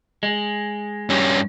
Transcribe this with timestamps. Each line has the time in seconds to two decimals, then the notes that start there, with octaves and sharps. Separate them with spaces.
0.23 G#3
1.10 G2 C#4